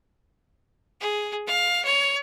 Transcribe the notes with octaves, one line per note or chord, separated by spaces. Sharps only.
G#4
F5
C#5